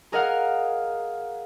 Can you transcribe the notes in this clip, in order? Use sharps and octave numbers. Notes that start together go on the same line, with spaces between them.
G#4 A#4 D#5 F5 F#5 F6